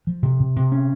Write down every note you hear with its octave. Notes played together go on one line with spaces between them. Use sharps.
F3
C3
C3
C3
C#4